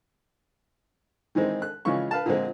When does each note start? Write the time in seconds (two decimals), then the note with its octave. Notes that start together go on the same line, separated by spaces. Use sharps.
1.35 D#3 E3 G#3 C4
1.62 F#6
1.85 C#3 E3 F3 G#3 F4 C#6
2.11 B4 F5 A5
2.26 A#2 D3 F3 G#3 C4